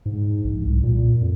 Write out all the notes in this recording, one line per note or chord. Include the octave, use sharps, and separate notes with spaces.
G#2
A#1
C2
A#2
F2